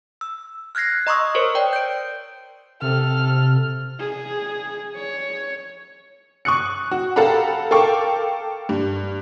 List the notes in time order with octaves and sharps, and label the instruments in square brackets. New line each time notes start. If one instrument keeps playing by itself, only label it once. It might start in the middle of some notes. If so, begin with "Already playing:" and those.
[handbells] E6
F6 F#6 G#6 A#6 C7
D#5 A#5 C6 C#6 D#6 E6
A#4 C5 C#5
D5 G5
G6 D7
[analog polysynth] C3 [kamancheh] A4 F6
[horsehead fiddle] G#4
C#5
[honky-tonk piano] C#6 D#6 F#6 C#7
F#4
G4 A4 F5 F#5 A#5 B5
A4 A#4 F5 G5 C#6 D6
G2